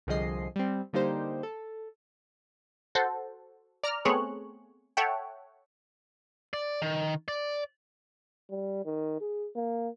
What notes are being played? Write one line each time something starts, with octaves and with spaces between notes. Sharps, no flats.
C2 D3 F3 G#4 D#5 C7
G3 C4
D3 G3 A#3 D#4 G4 C5
A4
F#4 A4 C5
D5 A#5 F6
A3 B3 C4 G#4 C#5 F#6
A4 C#5 E5 F#5 G5
D5
D#3
D5
G3
D#3
G#4
A#3